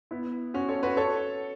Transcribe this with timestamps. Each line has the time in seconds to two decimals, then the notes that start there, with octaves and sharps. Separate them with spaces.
0.11 B3 E4
0.54 C#4 F#4
0.69 A4 C#5
0.83 F#4 B4
0.97 A4 C#5